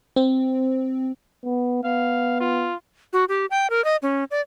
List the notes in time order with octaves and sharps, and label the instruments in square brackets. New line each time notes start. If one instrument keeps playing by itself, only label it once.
[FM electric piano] C4
[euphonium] B3
[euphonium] B3 [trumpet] F5
[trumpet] F4
[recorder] F#4
G4
G5
A#4
D#5
C#4
D5